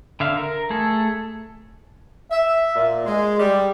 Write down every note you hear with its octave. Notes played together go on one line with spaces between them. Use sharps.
D3 E5 F5
A#4
A3 G#4 A4
E5
A#2
G#3
G3